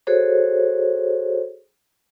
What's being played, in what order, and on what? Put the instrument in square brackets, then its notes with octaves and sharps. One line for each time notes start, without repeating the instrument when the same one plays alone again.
[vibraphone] F#4 G#4 A4 C5 C#5